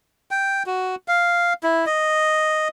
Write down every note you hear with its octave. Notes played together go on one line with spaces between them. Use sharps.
G5
F#4
F5
E4
D#5